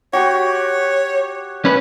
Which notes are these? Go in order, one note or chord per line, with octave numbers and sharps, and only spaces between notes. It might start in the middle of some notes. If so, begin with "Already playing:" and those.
F#4 G4 C#5 C6
C#4 B4